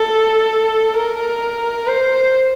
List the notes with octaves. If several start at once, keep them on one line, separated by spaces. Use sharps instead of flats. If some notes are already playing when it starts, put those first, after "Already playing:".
Already playing: A4
A#4
C5